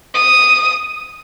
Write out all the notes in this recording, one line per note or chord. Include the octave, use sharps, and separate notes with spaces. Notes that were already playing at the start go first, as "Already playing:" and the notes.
D#6